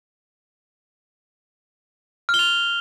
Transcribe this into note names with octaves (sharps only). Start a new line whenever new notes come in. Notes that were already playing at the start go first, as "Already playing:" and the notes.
F6
G7
F7